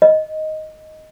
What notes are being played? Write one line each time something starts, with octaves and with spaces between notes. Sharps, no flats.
D#5